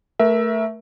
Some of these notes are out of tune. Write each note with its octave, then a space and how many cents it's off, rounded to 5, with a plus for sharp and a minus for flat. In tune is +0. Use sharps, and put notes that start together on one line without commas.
A3 +10 A#4 +30 E5 +0